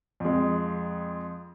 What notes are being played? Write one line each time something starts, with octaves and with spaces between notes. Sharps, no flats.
F2 G#3